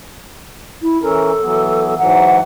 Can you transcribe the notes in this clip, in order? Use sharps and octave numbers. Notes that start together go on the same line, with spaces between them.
E4
E3 C#4 A4 A#4
E3 F#3 B3
G#2 E3 F#3 F#5